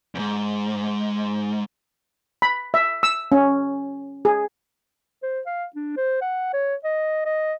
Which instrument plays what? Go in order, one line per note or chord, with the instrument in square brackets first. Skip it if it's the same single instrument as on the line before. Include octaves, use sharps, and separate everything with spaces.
[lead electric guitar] E2 G#2
[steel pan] B5
E5
E6
C#4
G#4
[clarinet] C5
F5
D4
C5
F#5
C#5
D#5
D#5